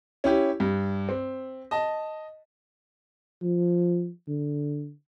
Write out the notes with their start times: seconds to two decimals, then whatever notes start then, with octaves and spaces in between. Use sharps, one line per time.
0.24 C#4 E4 G4
0.60 G2
1.09 C4
1.71 D#5 A5
3.42 F3
4.28 D3